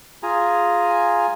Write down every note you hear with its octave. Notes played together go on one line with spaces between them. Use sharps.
F4 G#4 G#5 A#5